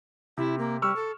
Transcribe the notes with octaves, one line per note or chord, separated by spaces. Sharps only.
C3 E4
A#3
G3 C#6 E6 F6
A4